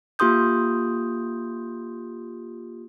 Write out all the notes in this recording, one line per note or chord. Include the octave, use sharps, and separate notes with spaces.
A#3 F4 G4 C6 D#6 G6